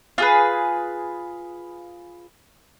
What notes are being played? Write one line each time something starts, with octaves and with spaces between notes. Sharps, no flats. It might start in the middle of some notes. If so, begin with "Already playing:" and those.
F4 G#4 B4